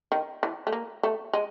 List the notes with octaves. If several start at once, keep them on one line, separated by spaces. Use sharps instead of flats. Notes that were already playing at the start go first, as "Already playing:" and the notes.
D#3
E3
A3
A#3
A3
G#3